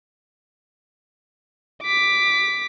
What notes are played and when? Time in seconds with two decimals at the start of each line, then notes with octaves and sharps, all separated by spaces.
1.83 D6 B6